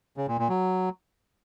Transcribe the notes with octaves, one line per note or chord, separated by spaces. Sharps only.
C#3
A#2
A#2
F#3